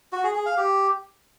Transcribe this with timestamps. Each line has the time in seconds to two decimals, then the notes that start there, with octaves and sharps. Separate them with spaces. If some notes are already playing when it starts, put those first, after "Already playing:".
0.13 F#4
0.24 G#4
0.35 G#4
0.46 F5
0.57 G4